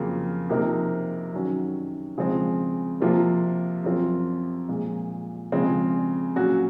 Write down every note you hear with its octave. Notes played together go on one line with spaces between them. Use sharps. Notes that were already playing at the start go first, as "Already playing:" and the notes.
Already playing: F2 C#3 F#3 A#3 F4
C3 F3 A#3 D#4 A#4
F#2 D#3 F#3 C#4 F#4
C#3 F3 G#3 C4
C3 F3 A#3 F4 A#4
F#2 F3 C4 F4 A#4
A#2 F3 G#3
C#3 F3 G#3 C4
A#2 F#3 C#4 F#4